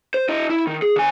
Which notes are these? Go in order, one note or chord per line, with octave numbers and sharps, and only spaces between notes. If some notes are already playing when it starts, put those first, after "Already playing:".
C5
E4 D#5
E4
D#3
G#4
D3 G#5